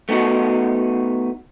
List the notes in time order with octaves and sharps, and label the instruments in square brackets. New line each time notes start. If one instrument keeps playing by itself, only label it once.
[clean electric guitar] A3 B3 D#4 F#4